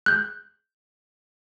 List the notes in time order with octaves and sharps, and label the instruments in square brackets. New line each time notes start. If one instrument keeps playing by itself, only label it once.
[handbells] F#6 G6